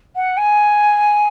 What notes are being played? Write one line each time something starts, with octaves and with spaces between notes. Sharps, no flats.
F#5
G#5